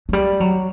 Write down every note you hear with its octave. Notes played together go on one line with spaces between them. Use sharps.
F#3
G3
F#3